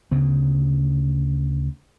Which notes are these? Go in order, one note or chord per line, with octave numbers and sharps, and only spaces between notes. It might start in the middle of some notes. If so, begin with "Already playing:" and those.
D2 C#3 B3